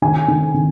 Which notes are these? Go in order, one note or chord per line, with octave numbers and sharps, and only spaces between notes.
D#3 G#5
D#3
D#3